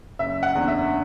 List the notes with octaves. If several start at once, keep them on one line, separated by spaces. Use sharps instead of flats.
F#1 E5
F#5
E2 D3
E5